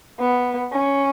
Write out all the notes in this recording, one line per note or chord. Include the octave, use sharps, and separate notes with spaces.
B3
C#4